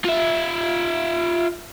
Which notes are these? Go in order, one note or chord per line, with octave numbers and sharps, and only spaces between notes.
F4 E5